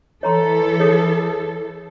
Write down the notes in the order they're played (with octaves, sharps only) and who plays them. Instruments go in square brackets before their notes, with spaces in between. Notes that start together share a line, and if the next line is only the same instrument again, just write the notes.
[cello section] E3 A4 [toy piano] C#5 A#5 C6
[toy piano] G#4 C#5 D#6